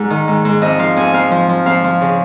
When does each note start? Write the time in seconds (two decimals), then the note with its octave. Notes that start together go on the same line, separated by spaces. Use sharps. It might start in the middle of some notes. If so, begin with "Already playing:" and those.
Already playing: G#2
0.10 D#3
0.28 G#2
0.45 G#2
0.62 F2 D#5
0.79 F3 F5
0.96 F2 G#5
1.14 F2 F5
1.31 F3
1.49 F3
1.66 F2 F5
1.84 F3
2.01 C#3